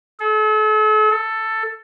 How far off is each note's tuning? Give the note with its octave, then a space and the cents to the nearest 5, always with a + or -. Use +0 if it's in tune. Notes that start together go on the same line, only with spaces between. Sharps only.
A4 -40
A4 +10